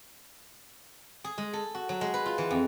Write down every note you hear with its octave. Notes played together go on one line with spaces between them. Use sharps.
G#4
G#3
A4
F#4
F#3
G#3
B4
F4
E3
F2